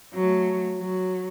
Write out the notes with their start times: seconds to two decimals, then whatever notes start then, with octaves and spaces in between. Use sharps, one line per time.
0.14 F#3 A3
0.78 F#3